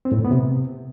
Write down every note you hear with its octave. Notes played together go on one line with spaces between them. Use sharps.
C4
A2
A#2
B3
C3